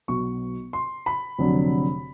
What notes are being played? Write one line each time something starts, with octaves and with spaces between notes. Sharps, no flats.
B1 B2 F#3 C#6
C6
B5
F1 F2 D3 F#3